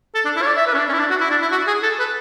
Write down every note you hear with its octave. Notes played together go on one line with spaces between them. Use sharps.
A4
D4
E4
C#5
D5
E5
B4
C#4
D4
C#4
E4
D4
F#4
E4
D4
E4
F#4
G#4
A4
B4